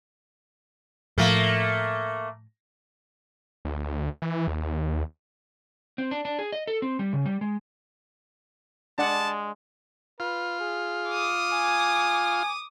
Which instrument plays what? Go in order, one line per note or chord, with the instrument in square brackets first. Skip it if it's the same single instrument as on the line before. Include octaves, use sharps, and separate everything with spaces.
[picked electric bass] A2 F3 [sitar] A3 A#3
[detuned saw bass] D2
E3
D#2
[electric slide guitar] C4
D4
D4
G#4
D#5
A4
C4
G3
C#3
G3
G#3
[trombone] G#3 [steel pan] D4 D5 F#5 [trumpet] A5
[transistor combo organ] F4 [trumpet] B4
[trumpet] G#4
[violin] D6 D#6
[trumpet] G#5